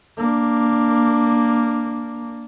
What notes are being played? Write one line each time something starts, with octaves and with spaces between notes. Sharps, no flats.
A#3 D4